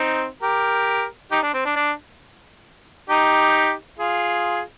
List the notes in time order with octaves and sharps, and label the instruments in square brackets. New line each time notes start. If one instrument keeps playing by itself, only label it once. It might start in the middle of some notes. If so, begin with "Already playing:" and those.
Already playing: [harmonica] C4 D#4
G4 A#4
D#4 G4
D4
C4
D4
D4
D#4 G4
F4 G#4